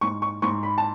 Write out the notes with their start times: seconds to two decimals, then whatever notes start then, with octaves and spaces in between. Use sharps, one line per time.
0.01 G#2 C#6
0.22 C#6
0.42 G#2 C#6
0.63 B5
0.78 A5